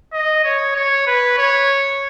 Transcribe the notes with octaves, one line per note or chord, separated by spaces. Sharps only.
D#5
C#5
C#5
B4
C#5